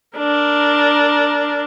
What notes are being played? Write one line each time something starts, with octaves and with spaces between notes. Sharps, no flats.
D4 A#4